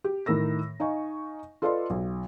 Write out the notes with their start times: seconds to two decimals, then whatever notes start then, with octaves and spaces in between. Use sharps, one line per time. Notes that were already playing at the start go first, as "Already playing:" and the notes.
0.04 G4
0.26 A2 D#3 A#4 E6 A#6
0.80 D#4 D#5 F5 G#5 C#6
1.62 F4 A4 B4 D5 D#5 C6
1.90 B1